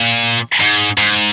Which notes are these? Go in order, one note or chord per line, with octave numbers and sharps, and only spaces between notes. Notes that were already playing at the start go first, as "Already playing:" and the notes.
Already playing: A#2
G#2
G#2